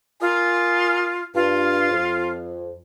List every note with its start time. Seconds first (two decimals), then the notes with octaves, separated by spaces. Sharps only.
0.21 F4 A#4 G#5 D#6
1.35 G2 F4
1.91 F2